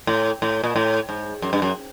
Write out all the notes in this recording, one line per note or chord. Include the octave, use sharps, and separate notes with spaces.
A2
A2
A#2
A2
G#2
F#2
G2
F#2